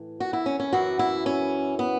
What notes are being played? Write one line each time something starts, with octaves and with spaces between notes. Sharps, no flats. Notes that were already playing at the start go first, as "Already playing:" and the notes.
Already playing: A2 E3
F#4
E4
C#4
C#4
F#2 E3 F#4
E4
C#4
B3